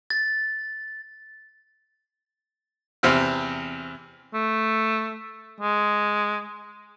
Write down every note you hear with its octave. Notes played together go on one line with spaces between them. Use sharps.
A6
E2 C3 C4 F6
A3
G#3